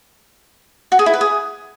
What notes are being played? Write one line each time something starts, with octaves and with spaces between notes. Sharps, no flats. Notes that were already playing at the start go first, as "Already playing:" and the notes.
F#4
G#4
E4
B4
G#4